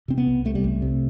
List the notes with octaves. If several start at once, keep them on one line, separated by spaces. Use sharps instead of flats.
C3 C4
B3
C2
C3 A3
G3
C2 A3
C3